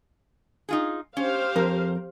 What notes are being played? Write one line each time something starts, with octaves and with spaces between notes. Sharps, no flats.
D#4 F4 G#4
C#4 G4 C5 F5
F2 A#4